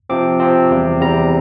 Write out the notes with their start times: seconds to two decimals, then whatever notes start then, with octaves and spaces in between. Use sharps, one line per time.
0.09 C3 F3 C4 D6
0.40 C3 F3 C4
0.71 E2 C3 G3
1.01 E2 C3 G3 A#5